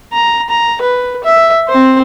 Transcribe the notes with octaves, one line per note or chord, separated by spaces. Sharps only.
A#5
A#5
B4
E5
C4 C5